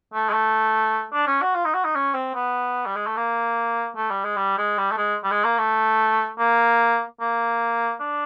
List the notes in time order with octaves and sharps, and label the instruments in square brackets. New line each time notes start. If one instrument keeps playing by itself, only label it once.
[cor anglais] A3
G#3
A3
D4
C#4
F#4
F4
D#4
F#4
D#4
C#4
C4
B3
G3
G#3
A3
A#3
A3
G3
G#3
G3
G#3
G3
A3
G#3
G3
G#3
A#3
A3
A#3
A#3
D4